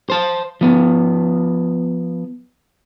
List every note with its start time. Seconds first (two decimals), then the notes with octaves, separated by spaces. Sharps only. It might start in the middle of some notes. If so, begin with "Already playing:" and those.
0.10 C5 A5
0.61 F3 B3